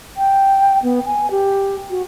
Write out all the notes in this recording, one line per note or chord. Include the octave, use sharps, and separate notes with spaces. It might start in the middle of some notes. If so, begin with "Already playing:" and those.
G5
B3
G#5
G4
F#4